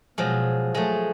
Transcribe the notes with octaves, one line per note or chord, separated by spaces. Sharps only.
B2 F3 F#3 G#3
F#3 G#3 A3